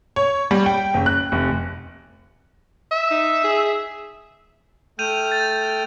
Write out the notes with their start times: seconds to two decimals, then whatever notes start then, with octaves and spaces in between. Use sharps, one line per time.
0.16 C#5
0.51 G3
0.66 G5
0.94 F#1
1.06 F#6
1.32 F1
2.92 E5
3.11 D#4
3.44 G#4
4.99 A3 G5 F6 G6 D#7 F7
5.32 A6